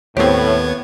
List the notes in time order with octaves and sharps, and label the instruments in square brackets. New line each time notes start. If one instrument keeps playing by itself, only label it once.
[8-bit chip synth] D#2 B3 G#6 [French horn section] A2 [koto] C4 G4 [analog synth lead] C#5